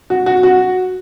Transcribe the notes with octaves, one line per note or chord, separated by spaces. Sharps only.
F#4
F#4
F#4